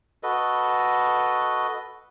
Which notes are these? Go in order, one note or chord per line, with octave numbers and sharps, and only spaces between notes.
F#4 A4 B4 D#5